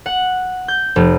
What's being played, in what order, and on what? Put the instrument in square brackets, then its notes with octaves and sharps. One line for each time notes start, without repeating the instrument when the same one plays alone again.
[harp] F#5
G6
F1